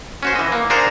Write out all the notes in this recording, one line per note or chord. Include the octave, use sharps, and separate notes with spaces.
C#4 F#4 C5
E3 D#5
A#3
D4 G#4 A#4 C5 F#5 A#5